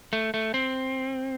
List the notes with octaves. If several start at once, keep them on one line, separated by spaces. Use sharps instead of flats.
A3
A3
C4